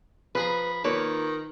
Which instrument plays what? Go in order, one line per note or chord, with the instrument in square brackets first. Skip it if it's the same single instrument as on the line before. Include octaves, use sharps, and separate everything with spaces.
[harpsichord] F3 G#4 A#5 [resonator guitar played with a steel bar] B4 [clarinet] B5
[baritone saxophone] D#3 [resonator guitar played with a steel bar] A#3 C#5 [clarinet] F4 [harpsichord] B4